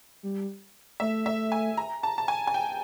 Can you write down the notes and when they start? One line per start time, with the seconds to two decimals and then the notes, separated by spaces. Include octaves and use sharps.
0.23 G3
1.00 A3 E5
1.26 E5
1.52 G#5
1.77 A#5
2.03 A5
2.18 A5
2.28 G#5
2.47 G#5
2.54 G5